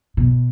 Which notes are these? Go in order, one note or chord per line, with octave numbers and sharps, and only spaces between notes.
B2